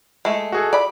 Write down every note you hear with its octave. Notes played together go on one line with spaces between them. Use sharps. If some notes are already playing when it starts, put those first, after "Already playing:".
G#3 A3
F#4 G#4 A4
D5 B5